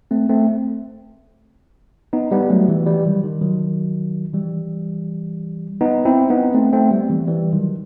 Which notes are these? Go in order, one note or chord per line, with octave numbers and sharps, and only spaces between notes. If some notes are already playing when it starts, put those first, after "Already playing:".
A3 C4
A3 C4
B3 D#4
G3 B3
F#3 A3
E3 G3
E3 G3
D#3 F#3
D#3
D#3 F#3
E3 G3
B3 D#4
C4 E4
B3 D#4
A3 C4
A3 C4
G3 B3
E3 G3
E3 G3
D#3 F#3